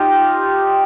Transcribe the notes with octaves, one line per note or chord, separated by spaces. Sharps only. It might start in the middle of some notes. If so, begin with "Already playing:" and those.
Already playing: D#4 F4 G4